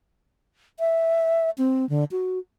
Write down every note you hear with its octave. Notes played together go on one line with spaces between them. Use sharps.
E5
C4
D3
F#4